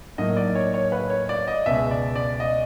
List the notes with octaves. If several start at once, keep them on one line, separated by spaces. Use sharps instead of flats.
A2 F#3 A#3 D#4 D#5
D5
C#5
C#5
B4
C#5
D5
D#5
C#2 B2 G#3 E5
D5
D5
D#5